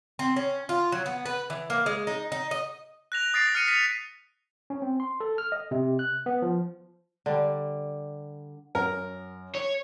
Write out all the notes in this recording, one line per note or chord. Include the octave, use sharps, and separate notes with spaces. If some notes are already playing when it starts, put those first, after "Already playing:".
C4
C#4
F4
F#3
B3
B4
E3
A#3
G#3
D#4
D#4
D#5
F#6 A#6 F7
D#6 A6 A#6 C7 D7
F6 A#6 C#7 D#7
B6 C#7 D#7 F7
C#4
C4
C6
A4
F6
D#5
C3
F#6
B3
F3
D3 G3
F#2 A#4
C#5